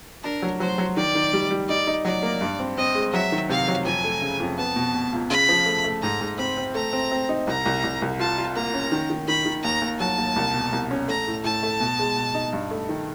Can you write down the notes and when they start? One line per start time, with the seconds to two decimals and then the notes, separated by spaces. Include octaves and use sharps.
0.24 D4 A#4
0.42 F#3
0.60 F#3 C5
0.78 F#3
0.97 D#3 D5
1.15 D#3
1.33 G3
1.51 G3
1.69 D#4 D5
1.87 D#4
2.05 F#3 D5
2.23 A#3
2.41 G2
2.59 C4
2.77 C4 D#5
2.95 G#3
3.13 F#3 E5
3.32 D#3
3.50 C3 F5
3.68 F#3
3.85 F2 G#5
4.04 A3
4.22 C#3
4.40 F2
4.58 B3 A5
4.76 B2
4.94 B2
5.13 C#2
5.30 C#3 B5
5.49 F3
5.66 A3
5.84 A3
6.02 G#2 A#5
6.21 G#2
6.38 C4 B5
6.57 C4
6.74 A3 A#5
6.93 C4
7.12 C4
7.29 D#4
7.47 C2 A#5
7.66 C2
7.84 C2
8.02 C2
8.19 F4 A5
8.38 F4
8.56 A#3 A#5
8.74 C#4
8.92 D#3
9.10 D#3
9.27 D#3 B5
9.46 D#3
9.63 D#2 A#5
9.82 D#2
9.99 F#3 A5
10.18 D#2
10.36 C2
10.54 B2
10.72 C2
10.91 C#4
11.08 A3 A#5
11.27 A2
11.44 A2 A5
11.63 A3
11.80 B2
11.99 G#3
12.17 B2
12.35 D#4
12.53 G2
12.71 A3
12.89 D#3